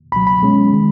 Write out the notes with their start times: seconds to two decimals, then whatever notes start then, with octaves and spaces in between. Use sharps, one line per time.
0.12 C#2 B2 F#3 B5
0.27 B5
0.42 B2 G#3 C#4
0.72 D#3 G#3